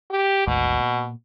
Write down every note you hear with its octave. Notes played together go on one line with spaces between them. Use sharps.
G4
G#1 D2 G#2 B2
A#2